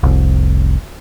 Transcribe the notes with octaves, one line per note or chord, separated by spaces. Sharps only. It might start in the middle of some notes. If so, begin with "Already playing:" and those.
F1 C2